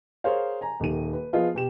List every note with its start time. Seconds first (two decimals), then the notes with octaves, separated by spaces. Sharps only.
0.24 G#4 A#4 C5 C#5 F5
0.61 G#5 A#5
0.80 D#1 D#3 D#7
1.13 B4
1.33 F3 B3 F4 G#4 D#5 F5
1.55 B2 G4 E7